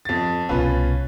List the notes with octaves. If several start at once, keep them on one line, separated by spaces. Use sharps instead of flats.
F2 A6
C2 B2 C#4 F4 B4